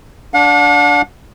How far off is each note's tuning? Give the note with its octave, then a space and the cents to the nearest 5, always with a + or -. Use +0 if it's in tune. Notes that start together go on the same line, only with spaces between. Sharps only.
D4 -15 F#5 -45